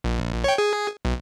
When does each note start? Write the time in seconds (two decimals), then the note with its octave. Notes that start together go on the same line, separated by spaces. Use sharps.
0.04 A#1
0.44 C#5 G5
0.58 G#4
1.05 B1